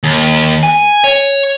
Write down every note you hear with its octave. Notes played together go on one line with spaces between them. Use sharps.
D#2
G#5
C#5